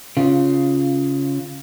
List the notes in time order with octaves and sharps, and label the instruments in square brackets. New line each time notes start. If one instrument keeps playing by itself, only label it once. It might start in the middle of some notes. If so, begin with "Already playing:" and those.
[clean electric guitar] C#3 F4